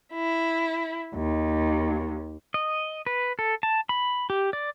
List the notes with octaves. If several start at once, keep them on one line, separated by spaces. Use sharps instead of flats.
E4
D#2
D#5
B4
A4
A5
B5
G4
D5